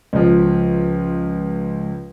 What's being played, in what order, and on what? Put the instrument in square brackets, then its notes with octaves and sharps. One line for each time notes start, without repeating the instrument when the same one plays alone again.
[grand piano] C#2 F3